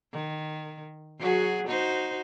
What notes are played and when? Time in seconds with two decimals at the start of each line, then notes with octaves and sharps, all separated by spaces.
0.13 D#3
1.19 F#3 F#4 G#4
1.68 D#4 F#4 C5